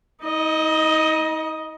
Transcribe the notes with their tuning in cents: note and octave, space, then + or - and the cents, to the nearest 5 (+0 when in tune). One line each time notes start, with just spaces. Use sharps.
D#4 +45 D#5 +0